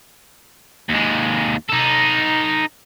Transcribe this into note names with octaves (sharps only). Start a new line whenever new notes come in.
D#2 G#3
D#4 A4